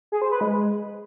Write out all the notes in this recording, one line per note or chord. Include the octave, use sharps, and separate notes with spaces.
G#4
C5
B4
G#3